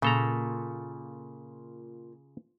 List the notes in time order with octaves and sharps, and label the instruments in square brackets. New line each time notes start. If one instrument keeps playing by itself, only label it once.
[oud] A#2 [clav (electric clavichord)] C#3 A4 A#5